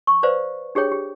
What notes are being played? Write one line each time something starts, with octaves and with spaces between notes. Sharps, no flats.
C#6
B4 C5 D5 F5
D4 G4 G#4 C#5 G5
G4